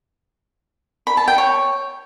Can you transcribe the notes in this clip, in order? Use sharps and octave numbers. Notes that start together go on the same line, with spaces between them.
B5
A5
G5
C#5